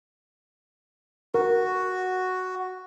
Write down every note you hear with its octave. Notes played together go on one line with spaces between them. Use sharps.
F#4 A#4